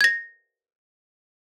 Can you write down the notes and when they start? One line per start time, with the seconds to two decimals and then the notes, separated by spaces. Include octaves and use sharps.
0.01 G#6 A#6